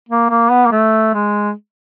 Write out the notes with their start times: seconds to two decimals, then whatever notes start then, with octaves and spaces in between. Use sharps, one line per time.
0.09 A#3
0.30 A#3
0.51 B3
0.66 A#3
0.72 A3
1.14 G#3